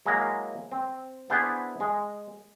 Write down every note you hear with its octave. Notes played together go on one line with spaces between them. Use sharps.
F#3 G#3 A#3 E4 F5 A#5
C4
B3 D4 E4 G#4 B4 C5
G#3